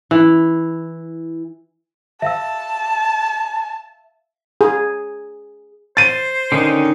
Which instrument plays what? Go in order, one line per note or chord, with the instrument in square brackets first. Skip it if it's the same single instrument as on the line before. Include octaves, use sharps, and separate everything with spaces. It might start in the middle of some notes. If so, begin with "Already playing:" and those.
[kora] E3
[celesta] E5 F5 E6 [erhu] A5
[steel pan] G#4
[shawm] C5 [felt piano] A6 D#7
[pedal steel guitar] D3 C#4 D#4 [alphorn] D#3